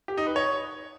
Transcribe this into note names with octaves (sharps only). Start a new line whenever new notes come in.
G4
D#4
B4
C#5